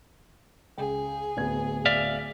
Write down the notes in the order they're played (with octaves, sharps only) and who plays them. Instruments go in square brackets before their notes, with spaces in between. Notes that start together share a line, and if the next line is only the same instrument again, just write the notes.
[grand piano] C#2 G5 [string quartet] G#4
[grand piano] D1 B3 G#6
[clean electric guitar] D5 E5 F5